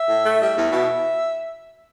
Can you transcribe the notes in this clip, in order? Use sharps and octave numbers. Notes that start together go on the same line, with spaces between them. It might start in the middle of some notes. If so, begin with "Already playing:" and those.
Already playing: E5
A2
A3
G3 E5
E2
B2